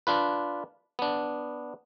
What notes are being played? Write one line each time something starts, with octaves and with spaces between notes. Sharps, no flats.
D4 F4 B4
B3 D4